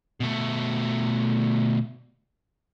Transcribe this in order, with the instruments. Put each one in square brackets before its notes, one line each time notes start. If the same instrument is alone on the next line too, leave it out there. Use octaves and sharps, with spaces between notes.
[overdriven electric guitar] B2 A3